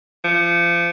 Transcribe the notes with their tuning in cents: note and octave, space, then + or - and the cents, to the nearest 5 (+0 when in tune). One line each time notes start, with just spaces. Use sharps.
F3 -30